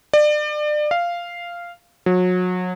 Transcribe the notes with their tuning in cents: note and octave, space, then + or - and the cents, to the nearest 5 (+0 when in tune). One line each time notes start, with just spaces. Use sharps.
D5 +30
F5 -10
F#3 -30